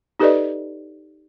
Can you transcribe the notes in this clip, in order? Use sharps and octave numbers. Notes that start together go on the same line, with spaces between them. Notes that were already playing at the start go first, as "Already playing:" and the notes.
D#4 G4 A4 B4 D5 D#5